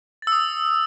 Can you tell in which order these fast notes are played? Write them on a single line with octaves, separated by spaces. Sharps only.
A6 E6 D#6